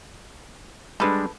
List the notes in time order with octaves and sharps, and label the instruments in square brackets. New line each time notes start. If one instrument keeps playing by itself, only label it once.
[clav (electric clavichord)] G3 G#3 D4 [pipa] A4 B4